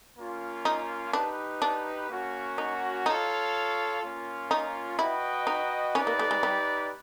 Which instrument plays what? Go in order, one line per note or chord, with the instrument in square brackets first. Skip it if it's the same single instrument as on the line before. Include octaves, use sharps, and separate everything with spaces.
[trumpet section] A#3 C#4 F4
[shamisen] D#4
[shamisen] D4 [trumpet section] D#4 G4 B4
[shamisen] D4
[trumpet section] A#3 C#4 F#4
[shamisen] D#4
[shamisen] D#4 [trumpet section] F4 A4 C#5 F5
[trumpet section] A#3 C#4 F4
[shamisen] D#4
[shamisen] E4 [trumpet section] F#4 B4 D#5 G5
[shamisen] D#4
[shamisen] C#4 [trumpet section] D#4 G4 B4 D5
[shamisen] A#3
A3
G#3
G3